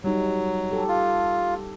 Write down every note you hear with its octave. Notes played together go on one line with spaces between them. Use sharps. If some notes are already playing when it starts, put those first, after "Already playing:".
F#3 G3 D#4
G4 A4
F4